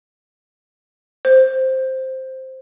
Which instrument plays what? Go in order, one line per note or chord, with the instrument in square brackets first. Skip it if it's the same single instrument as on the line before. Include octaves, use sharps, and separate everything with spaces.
[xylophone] C5